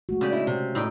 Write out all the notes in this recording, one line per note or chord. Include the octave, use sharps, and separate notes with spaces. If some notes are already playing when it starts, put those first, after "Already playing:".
G#3 A3 F#4
C#3 G4 D5
D#4 E4
C3
A2 D#4 G5